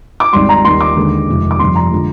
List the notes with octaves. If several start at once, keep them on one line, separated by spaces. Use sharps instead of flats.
D6
G#1 G#2 G3 C6
A#5
D#2 D#3 G3 C6
D6
D#2 D3 G#3
F1 F2 C3 D#3 G#3
D6
G1 F2 C3 G3 C6
A#5
D3 F3 G#3